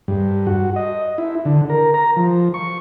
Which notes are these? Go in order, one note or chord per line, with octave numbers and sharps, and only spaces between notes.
G2
F#4
D#5
E4
D3
A#4
A#5
F3
C#6